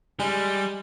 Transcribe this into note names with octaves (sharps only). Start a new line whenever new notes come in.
G3 G#3